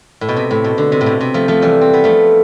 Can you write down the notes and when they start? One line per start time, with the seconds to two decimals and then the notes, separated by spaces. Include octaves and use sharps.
0.21 A2
0.28 B2
0.37 C3
0.51 A2
0.64 B2
0.78 D3
0.92 C3
1.01 A2
1.06 B2
1.21 C3
1.34 F3 A3
1.48 F3 A3
1.62 E3 G3
1.81 C4
1.94 B3
2.04 F3 A3